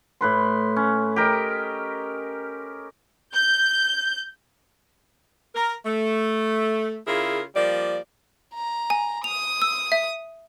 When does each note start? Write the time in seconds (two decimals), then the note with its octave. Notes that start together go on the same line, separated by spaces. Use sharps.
0.21 A2 B4 C6
0.76 C#4
1.16 G4 A#4 D#5
3.33 G6
5.55 A#4
5.86 A3
7.07 C#3 E4 F4 G#4 A#4
7.55 F3 G3 A#3 D5
8.55 A#5
8.90 G#5
9.24 D#6 F7
9.62 E6
9.92 E5